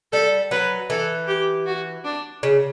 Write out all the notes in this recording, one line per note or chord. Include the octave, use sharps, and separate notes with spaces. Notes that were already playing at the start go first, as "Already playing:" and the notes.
G3 A4
F#3 B4
E3 A4
G4
F#4
D4
C#3